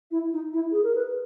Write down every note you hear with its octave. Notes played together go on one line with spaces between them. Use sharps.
E4
D#4
E4
G#4
A#4
B4